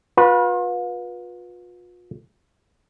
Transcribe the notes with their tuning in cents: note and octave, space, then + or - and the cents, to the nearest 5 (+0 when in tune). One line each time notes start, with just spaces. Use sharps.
F4 +40 B4 -20